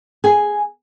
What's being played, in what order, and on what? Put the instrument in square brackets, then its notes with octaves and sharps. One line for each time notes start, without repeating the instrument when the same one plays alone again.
[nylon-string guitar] G#4 G#5